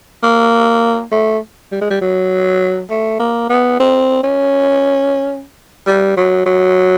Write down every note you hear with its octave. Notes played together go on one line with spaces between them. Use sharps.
A#3
A3
G3
G#3
G3
F#3
A3
A#3
B3
C4
C#4
G3
F#3
F#3